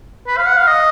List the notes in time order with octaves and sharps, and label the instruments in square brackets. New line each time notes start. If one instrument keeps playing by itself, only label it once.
[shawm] B4
F5
F#5
F5
D#5